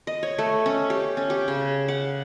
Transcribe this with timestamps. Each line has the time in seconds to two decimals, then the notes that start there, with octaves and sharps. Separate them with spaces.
0.07 D#5
0.23 C#5
0.38 A3
0.66 C#4
0.90 G4
1.17 C#4
1.30 G4
1.48 C#3
1.88 F#5